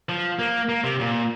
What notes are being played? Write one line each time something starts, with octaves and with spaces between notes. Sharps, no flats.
F3
A#3
A#3
C3
A#2